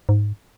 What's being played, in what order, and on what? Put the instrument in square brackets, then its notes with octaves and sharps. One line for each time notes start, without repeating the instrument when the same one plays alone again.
[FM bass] G#2